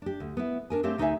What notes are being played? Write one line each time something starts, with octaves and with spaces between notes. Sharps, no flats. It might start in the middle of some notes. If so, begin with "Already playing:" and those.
D4 G4
D2
B3 E4
D4 A#4 G#5
A3 C4 G4 C5 C#5 F5
D2 D#4 C#5 D#5 E5 G#5